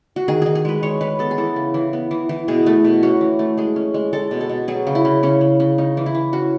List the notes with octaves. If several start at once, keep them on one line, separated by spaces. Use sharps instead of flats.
F#4
D#3 G#4
D#3 G#4
G#4
G#3 B4
G#3 C#5
G#3 B4
B3 A4
G#4
E3 A4
C#3
E3
B3
E3
E3
B2 G#4
A3
B2
C#4 F#4
E3
A3
G#3 G#4
C#4
G#3
G#3 A4
B2
A4
B2
F#3 G#4
C#3
E4
C#3
C#3 C#4
C#3
C#3
C#4 D#4
E3
E4
E3
C#4 F#4